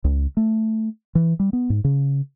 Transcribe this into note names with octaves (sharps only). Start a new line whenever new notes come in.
C#2
A3
E3
G3
B3
G#2
C#3